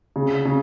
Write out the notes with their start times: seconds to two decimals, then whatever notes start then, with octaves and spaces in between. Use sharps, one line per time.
0.16 C#3
0.46 C#3